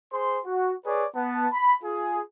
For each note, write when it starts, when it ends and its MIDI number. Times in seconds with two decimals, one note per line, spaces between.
0.13 0.39 68
0.13 0.39 72
0.13 0.39 84
0.46 0.73 66
0.86 1.05 68
0.86 1.05 71
0.86 1.05 73
0.86 1.05 74
1.16 1.47 59
1.16 1.47 81
1.53 1.75 83
1.83 2.21 65
1.83 2.21 68